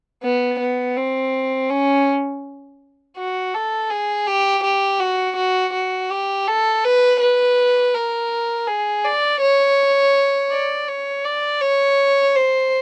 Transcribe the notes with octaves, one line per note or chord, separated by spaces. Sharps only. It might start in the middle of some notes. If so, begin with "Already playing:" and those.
B3
B3
C4
C#4
F#4
A4
G#4
G4
G4
F#4
F#4
F#4
G4
A4
B4
B4
A#4
G#4
D5
C#5
D5
C#5
D5
C#5
C5